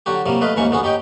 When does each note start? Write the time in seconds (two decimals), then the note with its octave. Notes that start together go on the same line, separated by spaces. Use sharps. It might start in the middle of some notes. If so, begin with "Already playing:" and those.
0.06 D3 F#3 F#4 G4
0.26 C2 C3 F#3 G3 A#3
0.41 A3 B4 D#5 F5
0.56 D#2 G#2 E3 A#3 C#4 C#6
0.70 A1 D2 B3 F#4 G#4
0.83 D#4 G4 C#5 D#5 G5